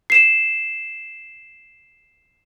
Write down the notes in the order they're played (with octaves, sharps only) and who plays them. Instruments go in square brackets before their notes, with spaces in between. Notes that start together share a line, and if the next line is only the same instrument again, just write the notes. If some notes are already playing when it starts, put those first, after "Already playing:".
[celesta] C7 E7